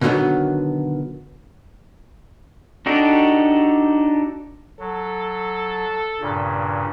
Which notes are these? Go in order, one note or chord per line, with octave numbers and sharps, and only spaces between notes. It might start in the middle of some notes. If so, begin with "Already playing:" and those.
B2 D3 D#3 F3 F#3 B3
D4 D#4 F#4 G4 A4
F#3 A4
G2 A#2 C#3